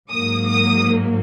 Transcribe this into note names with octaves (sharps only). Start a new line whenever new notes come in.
G#2 F#3 A#3 D#6
D#6